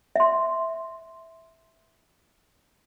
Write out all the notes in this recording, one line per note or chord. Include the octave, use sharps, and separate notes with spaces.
E5 C6